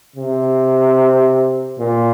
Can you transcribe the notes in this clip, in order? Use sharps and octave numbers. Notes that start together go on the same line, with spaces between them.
C3
A#2